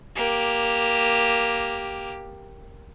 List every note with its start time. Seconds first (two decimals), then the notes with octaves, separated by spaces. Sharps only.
0.15 A#3 G4